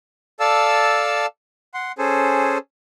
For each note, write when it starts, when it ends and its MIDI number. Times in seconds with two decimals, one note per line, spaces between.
0.40 1.26 69
0.40 1.26 74
0.40 1.26 77
0.40 1.26 81
0.40 1.26 88
1.74 1.92 78
1.74 1.92 84
1.98 2.58 61
1.98 2.58 68
1.98 2.58 69
1.98 2.58 72